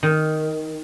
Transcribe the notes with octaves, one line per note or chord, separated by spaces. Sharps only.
D#3